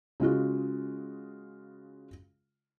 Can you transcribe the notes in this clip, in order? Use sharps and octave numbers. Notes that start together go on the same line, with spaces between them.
C#3 G#3 F4 F#4